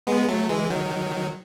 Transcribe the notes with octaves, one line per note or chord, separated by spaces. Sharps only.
G#3 B3
F#3 A3
E3 G#3
D#3 F#3